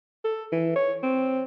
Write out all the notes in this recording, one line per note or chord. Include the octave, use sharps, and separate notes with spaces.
A4
E3
C#5
C4